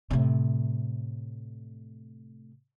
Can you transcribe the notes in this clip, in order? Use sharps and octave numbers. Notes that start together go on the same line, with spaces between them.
A2 C3